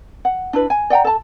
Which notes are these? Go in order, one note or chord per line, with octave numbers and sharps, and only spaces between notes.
F#5
D4 E4 B4
G#5
D5 F#5 G5 A#5
A4 A5